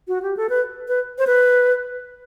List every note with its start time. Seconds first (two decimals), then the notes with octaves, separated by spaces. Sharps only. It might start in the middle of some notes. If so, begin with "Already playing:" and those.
0.08 F#4
0.22 G4
0.37 A4
0.49 B4
0.88 B4
1.18 C5
1.27 B4